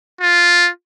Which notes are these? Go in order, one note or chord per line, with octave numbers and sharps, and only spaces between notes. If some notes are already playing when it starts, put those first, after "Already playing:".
F4